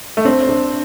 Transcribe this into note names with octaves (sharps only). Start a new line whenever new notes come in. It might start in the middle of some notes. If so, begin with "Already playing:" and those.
A3
C4 D4
D4